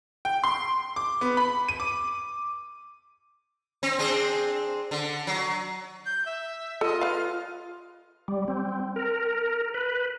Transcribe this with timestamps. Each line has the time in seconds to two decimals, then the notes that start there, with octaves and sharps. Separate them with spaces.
0.25 G5
0.44 C6
0.96 D6
1.21 B3
1.37 B5
1.68 D#7
1.80 D6
3.83 C4
3.99 C4 D4 G#4
4.91 D3
5.27 F#3
6.06 G6
6.26 E5
6.81 F4 A4 D#5
7.01 B4 D5 F5 F6
8.28 G3
8.48 C4
8.96 A#4
9.74 B4